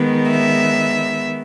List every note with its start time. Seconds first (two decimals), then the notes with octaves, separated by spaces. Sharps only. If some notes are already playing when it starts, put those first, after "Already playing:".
Already playing: D#3 G#3 B3
0.30 E5